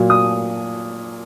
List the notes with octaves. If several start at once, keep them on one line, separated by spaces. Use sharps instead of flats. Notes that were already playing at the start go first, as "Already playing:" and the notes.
Already playing: A#2 F#3
D#6